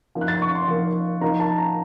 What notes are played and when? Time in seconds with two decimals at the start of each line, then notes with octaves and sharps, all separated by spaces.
0.15 F3 A#3 D#4
0.21 F#6
0.28 A6
0.42 C#6
0.55 C6
0.68 F3 A#3 D#4
1.21 F3 A#3 D#4 A#5
1.40 A5
1.58 A#5